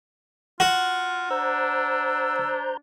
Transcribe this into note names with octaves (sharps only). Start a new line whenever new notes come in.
F4 F#4
D4 C5 A#5 E6 G6